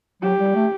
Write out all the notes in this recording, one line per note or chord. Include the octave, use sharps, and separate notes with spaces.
F#3 G4
G3
A3